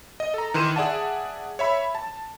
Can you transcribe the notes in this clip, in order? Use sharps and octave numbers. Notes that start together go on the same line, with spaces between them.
D#5
A4 A#5
D#3 E3 C6 D#7 E7
G#4 D5 E5 F#5 A5
C#5 E5 B5
A5